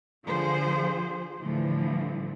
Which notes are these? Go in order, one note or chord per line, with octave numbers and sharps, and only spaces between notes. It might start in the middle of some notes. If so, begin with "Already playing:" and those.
D3 F3 F4 G#4 C5
A2 D3 E3 F3 G3